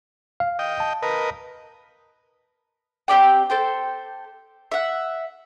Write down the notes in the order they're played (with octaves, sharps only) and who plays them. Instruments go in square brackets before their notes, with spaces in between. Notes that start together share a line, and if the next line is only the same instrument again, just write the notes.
[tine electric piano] F5
[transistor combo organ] D#5 G5
[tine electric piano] A5
[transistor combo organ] A#4 B4 D#5
[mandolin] C4 G4 D5 G5
A4 C5 G5
E5 F#5